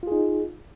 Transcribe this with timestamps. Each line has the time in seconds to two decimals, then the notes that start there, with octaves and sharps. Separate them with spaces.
0.03 F4
0.07 G#4
0.12 D#4